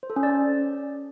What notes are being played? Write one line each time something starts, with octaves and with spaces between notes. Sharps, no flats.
C5
A4
C#4
D5
C#4